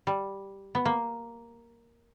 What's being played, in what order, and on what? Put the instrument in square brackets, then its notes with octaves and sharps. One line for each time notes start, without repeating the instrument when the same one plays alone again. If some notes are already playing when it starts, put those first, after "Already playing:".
[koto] G3
B3
A#3